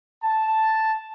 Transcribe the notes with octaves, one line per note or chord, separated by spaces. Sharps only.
A5